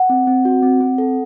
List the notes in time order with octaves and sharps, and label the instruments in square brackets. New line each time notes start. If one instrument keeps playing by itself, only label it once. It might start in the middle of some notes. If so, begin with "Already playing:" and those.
Already playing: [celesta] F#5
[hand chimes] C4
C4
F#4
C4
C4
A4